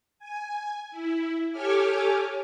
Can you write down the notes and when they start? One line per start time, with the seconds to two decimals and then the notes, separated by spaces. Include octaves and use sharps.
0.19 G#5
0.91 E4
1.52 G4 A4 C#5 G#5 D6 F6